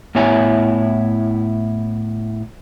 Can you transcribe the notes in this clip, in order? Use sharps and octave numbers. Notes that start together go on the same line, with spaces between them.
A2 B3 E4 C#5 G#5